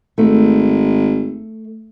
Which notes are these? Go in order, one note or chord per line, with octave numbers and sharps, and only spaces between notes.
G#1 A3